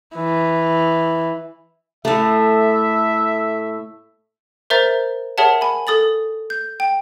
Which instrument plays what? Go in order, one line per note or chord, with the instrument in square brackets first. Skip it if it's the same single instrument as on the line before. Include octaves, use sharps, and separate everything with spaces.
[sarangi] E3
[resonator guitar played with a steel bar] A2 A3 [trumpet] E5
[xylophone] A#4 C5 E5 A#5 G6 A6
G#4 A#4 C#5 E5 F#5 A5
G#5 B5
A4 D#6 A6 F#7
G6
G5